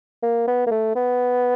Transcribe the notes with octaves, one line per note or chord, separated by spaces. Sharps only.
A#3
B3
A#3
A3
B3